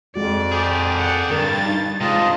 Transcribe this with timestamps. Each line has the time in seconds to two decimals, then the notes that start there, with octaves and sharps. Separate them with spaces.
0.16 F2 G#3 F#4 D5
0.52 G4 G#4
0.96 D5 F#5
1.30 G2 D3 A#4 A6
1.66 D#4
2.01 C3 G#3 D4 F4 D#5